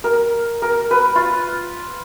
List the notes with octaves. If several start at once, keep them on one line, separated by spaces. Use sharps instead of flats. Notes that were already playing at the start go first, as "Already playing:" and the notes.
A#4
A#4
B4
F4